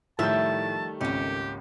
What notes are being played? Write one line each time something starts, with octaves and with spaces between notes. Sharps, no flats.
A2 D#3 F3 G3 A3 E5 A5 G6
G#1 C#2 A#3 C#4 G4